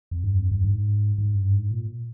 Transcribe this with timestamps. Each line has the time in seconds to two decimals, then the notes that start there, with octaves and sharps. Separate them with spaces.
0.11 F2
0.24 G2
0.38 F2
0.51 G2
0.64 G#2
1.18 G#2
1.35 G2
1.53 G#2
1.71 A#2